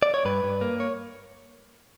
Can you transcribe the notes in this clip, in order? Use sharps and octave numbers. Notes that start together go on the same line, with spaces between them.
D5
C#5
G2 B4
G2
A#3
C#5